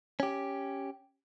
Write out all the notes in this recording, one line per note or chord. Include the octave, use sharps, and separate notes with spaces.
C#4 G4